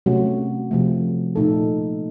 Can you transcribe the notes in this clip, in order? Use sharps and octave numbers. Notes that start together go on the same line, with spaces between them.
C3 F#3 A3 C#4 F#4
C3 F3 A3
A#2 A3 D#4 A4